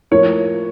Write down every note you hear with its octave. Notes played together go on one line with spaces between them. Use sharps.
A2 F3 A#3 C#5